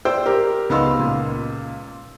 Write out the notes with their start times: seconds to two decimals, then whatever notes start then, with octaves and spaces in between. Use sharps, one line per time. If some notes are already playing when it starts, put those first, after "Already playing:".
0.05 C5 D5 G5 E6
0.26 G4 A#4
0.69 C#2 B3 D#4 F5 C6 E6
0.99 C#2 A#2